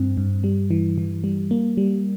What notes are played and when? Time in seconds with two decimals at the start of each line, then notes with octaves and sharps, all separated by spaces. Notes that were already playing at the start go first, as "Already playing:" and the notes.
Already playing: G2 C4
0.17 G2
0.44 G3
0.71 E3
0.98 E3
1.24 G3
1.51 A#3
1.77 G3